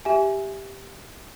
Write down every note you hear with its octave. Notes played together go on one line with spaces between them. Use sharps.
G4 E5 G#5